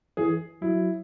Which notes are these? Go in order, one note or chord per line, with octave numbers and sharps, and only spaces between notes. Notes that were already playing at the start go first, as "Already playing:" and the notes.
E3 G#4
F#3 E4